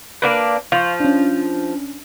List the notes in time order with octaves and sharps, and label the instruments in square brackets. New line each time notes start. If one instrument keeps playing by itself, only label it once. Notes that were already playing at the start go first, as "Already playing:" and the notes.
[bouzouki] A#3 D4 B4
[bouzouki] F3 [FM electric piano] F5 C6 C#6
[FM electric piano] C#4 D4